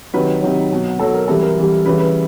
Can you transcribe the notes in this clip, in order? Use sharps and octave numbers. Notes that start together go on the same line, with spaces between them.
C3 D#3 F#3 B4
C3 D#3 F#3
B2 F#3
B2 F#3 A4
A#4
C3 E3 G3 A4
A#4
C3 E3 G3
C#3 E3 G3 B4
B4